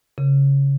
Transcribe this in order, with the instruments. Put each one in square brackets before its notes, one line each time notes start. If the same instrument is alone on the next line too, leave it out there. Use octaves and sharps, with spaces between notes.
[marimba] C#3